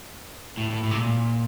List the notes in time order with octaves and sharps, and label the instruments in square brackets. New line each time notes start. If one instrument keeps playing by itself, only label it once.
[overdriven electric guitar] A2
A2
A2
C3
A#2